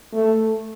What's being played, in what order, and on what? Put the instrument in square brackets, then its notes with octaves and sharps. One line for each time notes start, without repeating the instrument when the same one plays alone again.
[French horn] A3